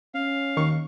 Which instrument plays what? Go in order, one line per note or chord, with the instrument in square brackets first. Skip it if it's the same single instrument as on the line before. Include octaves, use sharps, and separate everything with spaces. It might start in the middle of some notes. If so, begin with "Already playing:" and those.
[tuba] C#4 [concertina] F5
[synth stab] D#2 C#6